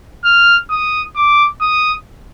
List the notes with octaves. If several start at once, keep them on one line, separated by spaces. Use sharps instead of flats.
F6
D#6
D6
D#6